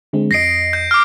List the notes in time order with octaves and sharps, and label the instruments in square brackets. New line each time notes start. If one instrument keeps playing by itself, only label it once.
[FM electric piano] D3 G#3 C4
[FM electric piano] F2 D#5 [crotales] A#6 C7 D7
[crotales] G6
D6 F6